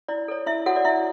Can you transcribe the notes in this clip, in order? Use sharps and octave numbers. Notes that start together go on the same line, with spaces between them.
E4 D5
A4 C#5
E4 E5
F#4 A4 C#5 F#5
D5
E4 E5